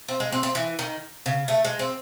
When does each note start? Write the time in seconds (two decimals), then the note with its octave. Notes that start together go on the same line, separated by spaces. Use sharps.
0.08 C4
0.20 G#3
0.32 C4
0.43 C4
0.55 E3
0.79 D#3
1.26 C#3
1.48 A3
1.65 G#3
1.79 C4